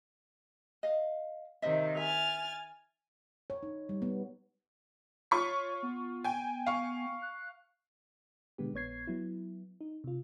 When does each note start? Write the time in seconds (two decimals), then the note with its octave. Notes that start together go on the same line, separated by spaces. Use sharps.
0.83 D#5 F5
1.62 C3 D#3 C5 D#5 E5
1.97 E5 G#5 F6 A6
3.50 C#5
3.63 D#4
3.89 G3
4.02 B3
5.31 F4 C#5 C#6 B6
5.83 B3
6.24 G5 G#5
6.66 F5 C#6
7.22 F#6
8.58 B2 D3 G#3 B3 G4
8.74 A#1 B3 C#5 G#6 C7
9.07 F#3 B3 E4
9.81 D#4
10.04 C3 F4